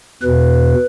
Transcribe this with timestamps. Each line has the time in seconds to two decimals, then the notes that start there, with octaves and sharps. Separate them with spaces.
0.22 E2 B2 B4